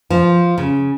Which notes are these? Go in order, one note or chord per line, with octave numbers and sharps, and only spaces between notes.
F3
C#3